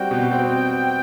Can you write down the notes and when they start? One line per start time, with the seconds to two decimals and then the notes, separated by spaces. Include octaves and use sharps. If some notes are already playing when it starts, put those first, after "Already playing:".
Already playing: G3 C4 F#4 G5
0.11 B2
0.31 C4